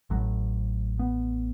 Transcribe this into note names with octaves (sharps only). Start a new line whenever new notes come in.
A1 A2 F#3
B3